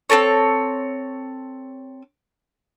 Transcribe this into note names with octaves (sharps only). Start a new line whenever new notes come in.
C4 D#4 A4 C#5